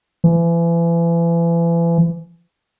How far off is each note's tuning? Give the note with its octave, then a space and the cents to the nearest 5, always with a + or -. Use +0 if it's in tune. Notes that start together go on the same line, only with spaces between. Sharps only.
E3 +35